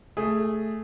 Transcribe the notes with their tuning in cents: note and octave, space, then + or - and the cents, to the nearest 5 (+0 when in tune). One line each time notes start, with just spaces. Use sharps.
A3 +0 G#4 +0